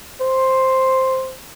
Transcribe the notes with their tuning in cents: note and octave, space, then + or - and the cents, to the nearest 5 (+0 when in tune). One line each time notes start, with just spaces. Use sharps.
C5 +5